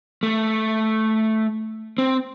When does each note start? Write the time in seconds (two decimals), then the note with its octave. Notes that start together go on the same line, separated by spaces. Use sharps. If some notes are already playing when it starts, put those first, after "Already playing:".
0.23 A3
1.98 C4